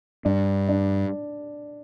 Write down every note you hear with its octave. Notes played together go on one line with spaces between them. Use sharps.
G2 D4
D4